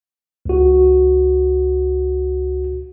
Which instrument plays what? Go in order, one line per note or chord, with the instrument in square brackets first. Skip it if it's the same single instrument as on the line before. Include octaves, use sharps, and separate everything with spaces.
[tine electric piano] C#2 F#4